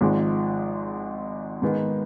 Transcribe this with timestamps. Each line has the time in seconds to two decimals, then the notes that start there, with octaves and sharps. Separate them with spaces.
0.01 G#1 G#2 F3 G#3
1.62 G#2 D#3 G#3 B3